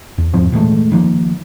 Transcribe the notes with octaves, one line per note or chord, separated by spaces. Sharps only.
E2
E2 G#2 F3 C4
A#2 E3 G#3 A3
D#3 F3 G3 A#3